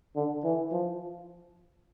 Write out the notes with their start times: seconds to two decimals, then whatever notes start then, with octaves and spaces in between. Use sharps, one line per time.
0.16 D3
0.44 E3
0.72 F3